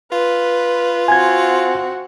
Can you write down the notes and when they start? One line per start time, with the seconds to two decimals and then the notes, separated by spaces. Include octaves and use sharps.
0.12 F4 B4
1.08 C4 F#4 G#5 G#6